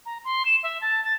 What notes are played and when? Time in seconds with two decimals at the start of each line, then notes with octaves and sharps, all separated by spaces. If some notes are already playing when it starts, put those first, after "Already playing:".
0.06 A#5
0.24 C6
0.45 E7
0.63 E5
0.81 A5
1.04 A6